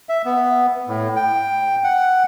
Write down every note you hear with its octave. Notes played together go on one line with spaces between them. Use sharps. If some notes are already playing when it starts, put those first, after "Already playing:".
E5
B3
A2
G5
F#5